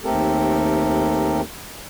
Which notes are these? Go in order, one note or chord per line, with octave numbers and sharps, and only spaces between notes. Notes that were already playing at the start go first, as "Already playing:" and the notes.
D#2 A3 C4 G4 A4 A#4